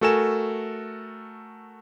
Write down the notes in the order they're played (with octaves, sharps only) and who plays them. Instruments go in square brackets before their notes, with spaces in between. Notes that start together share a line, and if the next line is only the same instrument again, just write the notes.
[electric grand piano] A3 F#4 A4 A#4 G#5 E7